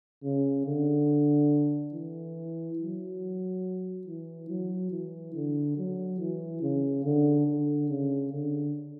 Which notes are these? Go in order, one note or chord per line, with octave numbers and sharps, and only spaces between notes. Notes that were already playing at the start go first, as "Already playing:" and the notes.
C#3
D3
E3
F#3
E3
F#3
E3
D3
F#3
E3
C#3
D3
D3
C#3
D3